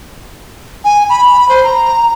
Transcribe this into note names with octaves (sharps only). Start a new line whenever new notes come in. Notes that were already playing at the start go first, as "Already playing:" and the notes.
G#5
B5
C5
A#5